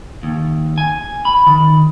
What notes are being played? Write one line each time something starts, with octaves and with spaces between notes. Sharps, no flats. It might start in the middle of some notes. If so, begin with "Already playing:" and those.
D#2
G#5
B5
D#3